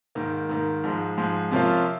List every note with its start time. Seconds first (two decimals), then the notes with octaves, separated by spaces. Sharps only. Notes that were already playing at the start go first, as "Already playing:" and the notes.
0.15 G#2 D#3 A#3
0.49 G#2 D#3 A#3
0.84 G#2 F3 G#3
1.18 G#2 F3 G#3
1.51 C3 F3 A#3 C#4 F4